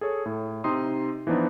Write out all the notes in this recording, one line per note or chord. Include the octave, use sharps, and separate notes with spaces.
G#4 A4 C#5
A2
C3 D#4 C6 D#6
E3 F3 B3 D4 D#4